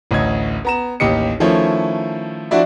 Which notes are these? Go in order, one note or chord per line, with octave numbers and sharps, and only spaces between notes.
A1 D2 D#5 G#6
B3 A#5 E7
A1 D#2 G4 D#5 C#7
D#3 F3 A3 C#4 E4 C#5
F3 D4 E4 F#4 D5 E5